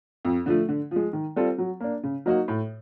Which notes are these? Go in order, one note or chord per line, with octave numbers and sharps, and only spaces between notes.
F2
D3 F3 A3
D3
F3 G#3
D#3
G3 C4 F4 A4
F#3
A#3 D4
C#3
F#3 A#3 D#4 F#4
A2